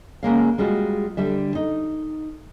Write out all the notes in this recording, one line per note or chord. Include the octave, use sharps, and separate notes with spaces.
C#3 G#3 A#3 F5
G3 G#3 F4 F#4
D3 G3 E5
D#4